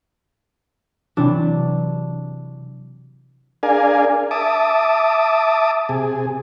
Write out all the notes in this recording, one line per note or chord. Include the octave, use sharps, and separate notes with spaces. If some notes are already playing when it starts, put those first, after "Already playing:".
C3 E3 F#3 D4
D4 G#4 A#4 D5 F5 G#5
E5 A5 D6 D#6
C3 G#4